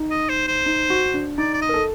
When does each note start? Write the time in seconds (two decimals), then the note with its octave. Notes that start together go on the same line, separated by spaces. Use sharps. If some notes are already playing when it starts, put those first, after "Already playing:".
Already playing: D#4
0.11 D#5
0.29 C5
0.48 C5
0.66 D#4
0.90 F#4
1.14 D4
1.38 D#4 D5
1.54 D5
1.62 D#5
1.69 A#4
1.74 A4